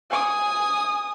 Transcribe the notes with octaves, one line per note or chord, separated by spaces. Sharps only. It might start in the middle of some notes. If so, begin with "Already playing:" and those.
G#5 D#6